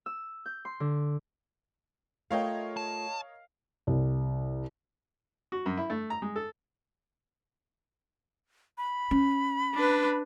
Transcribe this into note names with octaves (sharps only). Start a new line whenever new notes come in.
E6
G6
C6
D3
A3 F4 A#4 C#5 D#5 F5 G5
A5
C2
F#4
F#2
E4
A3
A#5
G#3
A4
B5
C#4
D4 B4